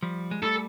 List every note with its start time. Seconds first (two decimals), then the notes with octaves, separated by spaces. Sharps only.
0.02 F3 G3
0.31 G#3
0.43 G3 A3 A4